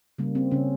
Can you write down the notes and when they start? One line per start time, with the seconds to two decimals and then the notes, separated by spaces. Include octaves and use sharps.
0.18 C#3 G3 A#3
0.35 C4
0.51 C#3 C#4